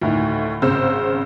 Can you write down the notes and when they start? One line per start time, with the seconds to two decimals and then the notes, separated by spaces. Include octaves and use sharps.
0.01 D2 A2 D#3
0.62 G#1 C#3 C5 E6